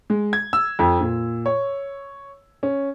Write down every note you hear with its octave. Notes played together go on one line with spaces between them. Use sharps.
G#3
G#6
E6
F2
A#2
C#5
C#4